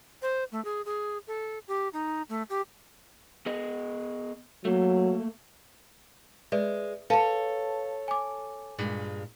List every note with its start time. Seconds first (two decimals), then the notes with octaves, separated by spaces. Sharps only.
0.22 C5
0.52 A3
0.65 G#4
0.86 G#4
1.27 A4
1.68 G4
1.93 D#4
2.29 A3
2.50 G4
3.46 B3 G#4 D#5
4.65 F#3 A3 A#3
6.52 G#3 B4 D5 E5
7.10 A4 B4 C#5 F5 A5
8.08 G#5 D6
8.79 G2 A#2 G#3